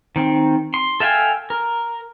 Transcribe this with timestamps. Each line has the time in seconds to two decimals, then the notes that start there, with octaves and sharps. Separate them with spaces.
0.16 D#3 C4
0.74 C6
1.00 A4 E5 F5 G5 G#5
1.50 A#4